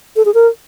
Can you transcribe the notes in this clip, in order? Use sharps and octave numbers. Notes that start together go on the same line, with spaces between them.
A4
G#4
A#4